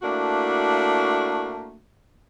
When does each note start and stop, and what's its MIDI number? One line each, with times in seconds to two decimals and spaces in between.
0.02 1.79 57
0.02 1.79 58
0.02 1.79 62
0.02 1.79 64
0.02 1.79 66